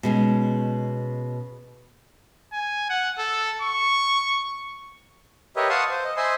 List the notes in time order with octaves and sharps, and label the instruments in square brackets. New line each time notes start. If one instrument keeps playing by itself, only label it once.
[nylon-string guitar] B2 G#3 C#4
[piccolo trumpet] G#5
F#5
A4
C#6
[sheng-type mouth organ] G4 A#4 B4 C#5 D#5 E5
F5 F#5 A5 C6 C#6 D#6
C5
D#5
C5 D#5 E5 G#5 B5 C6